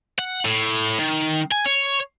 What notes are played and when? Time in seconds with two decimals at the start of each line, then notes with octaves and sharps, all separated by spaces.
0.19 F#5
0.45 A2
0.99 D#3
1.51 G#5
1.65 C#5